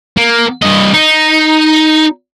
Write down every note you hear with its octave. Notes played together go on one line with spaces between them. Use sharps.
A#3
G2 D#5
D#4